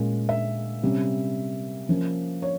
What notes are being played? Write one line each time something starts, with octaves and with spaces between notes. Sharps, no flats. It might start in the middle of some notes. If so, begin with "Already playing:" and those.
Already playing: A#2 G#3 C#4
E5
C3 G3 C#4
F3 A#3 C#4
C#5